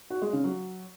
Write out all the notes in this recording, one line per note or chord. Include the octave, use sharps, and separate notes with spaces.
F#4
G#3
C#3
F#3